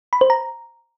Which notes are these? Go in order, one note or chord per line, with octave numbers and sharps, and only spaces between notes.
B5
C5
A#5